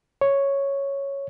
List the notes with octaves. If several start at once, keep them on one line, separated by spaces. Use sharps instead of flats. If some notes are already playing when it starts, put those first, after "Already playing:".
C#5